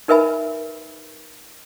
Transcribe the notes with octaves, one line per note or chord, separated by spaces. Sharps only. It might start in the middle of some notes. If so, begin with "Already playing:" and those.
D#4 A#4 B4 E5 G#5 B5